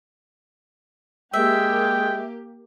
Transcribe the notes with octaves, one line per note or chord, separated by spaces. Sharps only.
G#3 A#3 G4 E5 G5